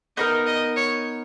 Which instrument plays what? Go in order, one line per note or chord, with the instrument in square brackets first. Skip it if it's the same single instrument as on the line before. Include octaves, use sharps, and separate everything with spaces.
[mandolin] B3 D#4 A#4 [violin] D#5
[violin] D#5
C#5